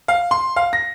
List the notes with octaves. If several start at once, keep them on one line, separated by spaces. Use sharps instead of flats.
F5
C6
F5
A#6